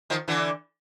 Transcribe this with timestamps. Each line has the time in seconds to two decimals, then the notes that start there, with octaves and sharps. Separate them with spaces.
0.10 D#3 F3
0.28 D3 E3